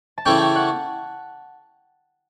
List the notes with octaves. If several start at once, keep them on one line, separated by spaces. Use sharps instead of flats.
A5
C#3 E3 A3 C#4 G5
G5
F#5